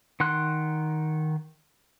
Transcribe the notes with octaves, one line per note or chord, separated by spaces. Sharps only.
D#3 F#5 C6 F#6